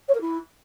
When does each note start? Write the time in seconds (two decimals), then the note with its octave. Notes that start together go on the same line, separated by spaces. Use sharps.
0.08 C#5
0.14 A#4
0.21 E4